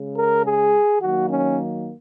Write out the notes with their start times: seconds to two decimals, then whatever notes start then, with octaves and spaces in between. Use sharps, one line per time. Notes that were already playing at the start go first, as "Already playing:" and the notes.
Already playing: C#3 G#3
0.17 A#4
0.46 G#4
1.01 D#3 F#3 A#3 F#4
1.30 C#4